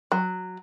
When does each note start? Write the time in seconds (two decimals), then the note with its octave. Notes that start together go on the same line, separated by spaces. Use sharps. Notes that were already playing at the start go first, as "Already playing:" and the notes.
0.12 F#3